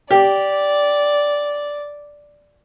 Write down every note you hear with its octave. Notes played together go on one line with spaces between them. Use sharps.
G4 D5